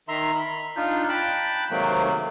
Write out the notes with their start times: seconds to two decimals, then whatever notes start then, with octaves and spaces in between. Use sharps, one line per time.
0.08 D#3 E5 A#5 C6
0.35 B5
0.76 D4 D#4 F4 G6
1.09 G5 A5 B5 F#6
1.71 G#2 C3 D#3 F#3 A3 A#3